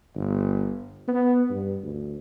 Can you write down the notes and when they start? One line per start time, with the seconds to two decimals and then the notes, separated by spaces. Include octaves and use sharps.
0.15 G1
1.08 B3
1.50 G2
1.83 D2